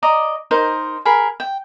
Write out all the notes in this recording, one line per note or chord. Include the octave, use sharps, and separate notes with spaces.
D5 D#5 A#5
D#4 A#4 C5
G#4 A#4 B5
G5